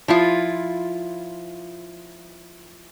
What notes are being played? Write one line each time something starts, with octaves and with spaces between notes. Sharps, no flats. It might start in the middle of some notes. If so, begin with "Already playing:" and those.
F3 E4 F4